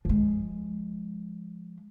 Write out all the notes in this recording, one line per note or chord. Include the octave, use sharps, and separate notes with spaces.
F3 G#3